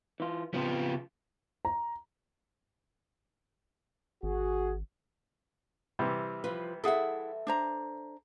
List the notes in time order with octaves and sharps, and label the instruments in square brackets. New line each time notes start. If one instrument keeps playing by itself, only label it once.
[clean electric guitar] E3 F4
[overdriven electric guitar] C#3 B3 [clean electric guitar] F3 C4 F4
[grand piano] A#5
[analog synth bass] G#1 [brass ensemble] F#4 G#4
[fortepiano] C3 E3 G3
[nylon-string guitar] F3 F4 B4
[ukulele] E4 G#4 F#5 [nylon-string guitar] A4 E5
[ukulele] D4 C5 A#5